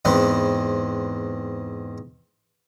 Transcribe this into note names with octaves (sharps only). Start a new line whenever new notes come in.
E2 G#2 C4 B4 C5